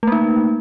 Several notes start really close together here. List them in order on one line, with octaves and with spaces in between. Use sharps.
A3 A#3 D#4